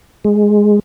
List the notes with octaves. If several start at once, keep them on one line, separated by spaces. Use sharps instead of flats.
G#3